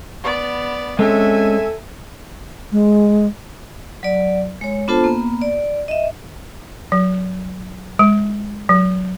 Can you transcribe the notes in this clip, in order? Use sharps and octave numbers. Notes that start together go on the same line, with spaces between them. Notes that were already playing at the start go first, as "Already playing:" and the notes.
B3 D5
G#3 C4 C#4 A4 E5 G#5
G#3
F#3 D5
G#3 C#5
B3 D4 F4 A4 C5 A5
A#3 B3
D5
D#5 E5
F#3
G#3
F#3